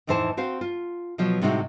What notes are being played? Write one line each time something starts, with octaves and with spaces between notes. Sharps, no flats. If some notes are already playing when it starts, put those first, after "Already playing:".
F2 A2 E3 D#4 C5 A5
C4 F#4 C5 F5
F4
B2 F3 F#3
A2 C3 G3 G#3 D#4 F#4